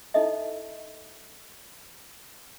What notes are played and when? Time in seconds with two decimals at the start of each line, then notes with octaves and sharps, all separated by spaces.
0.14 D#4 E4 A4 D#5 E5